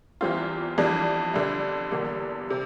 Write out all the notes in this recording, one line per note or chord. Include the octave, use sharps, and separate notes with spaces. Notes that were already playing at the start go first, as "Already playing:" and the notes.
E2 E3 G3 C4 F4
F2 E3 G3 D4
F2 D3 G3 D4
E2 D3 G3 A#3
C3